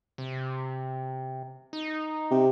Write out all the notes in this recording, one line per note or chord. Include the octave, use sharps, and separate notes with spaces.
C3
D#4
C3